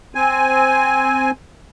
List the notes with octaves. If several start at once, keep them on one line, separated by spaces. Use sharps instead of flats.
C4 G#5